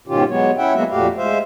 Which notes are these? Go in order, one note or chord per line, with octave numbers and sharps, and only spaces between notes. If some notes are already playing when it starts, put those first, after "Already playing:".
G#2 B2 D#3 C#4 F4 G4
F#3 G#3 B3 C#5
C#4 E4 E5 F#5 G5
F#3 G#3 A#3 B3 F#4 E5
F2 A#2 A3 F#4 G4 F5
G#3 C5 E5 F5